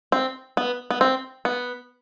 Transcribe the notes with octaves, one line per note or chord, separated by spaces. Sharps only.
C4
B3
B3
C4
B3